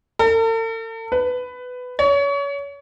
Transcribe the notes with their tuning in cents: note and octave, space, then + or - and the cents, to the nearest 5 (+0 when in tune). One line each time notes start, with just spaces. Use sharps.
A4 +45
B4 +15
C#5 +30